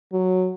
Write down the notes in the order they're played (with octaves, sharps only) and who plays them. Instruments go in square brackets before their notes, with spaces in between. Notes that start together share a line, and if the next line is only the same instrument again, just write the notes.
[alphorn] F#3